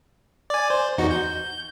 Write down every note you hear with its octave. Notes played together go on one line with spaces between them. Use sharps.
D5 G#5
C5
E2 D#4 F#4
G6